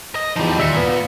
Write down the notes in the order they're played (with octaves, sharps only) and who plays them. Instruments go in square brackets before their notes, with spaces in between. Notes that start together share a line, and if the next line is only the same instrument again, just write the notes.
[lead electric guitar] D#5
[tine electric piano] E2 D#4 [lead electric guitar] F3 G3
[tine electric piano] D#2 E5 C#7 [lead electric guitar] A#2
[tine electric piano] B3